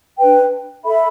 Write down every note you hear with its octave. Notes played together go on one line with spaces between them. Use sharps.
D4 B4 G5
A4 E5 B5